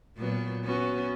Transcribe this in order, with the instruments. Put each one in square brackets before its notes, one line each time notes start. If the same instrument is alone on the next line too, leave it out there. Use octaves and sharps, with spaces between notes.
[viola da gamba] A#2 F#3 B3
B3 C#4 F#4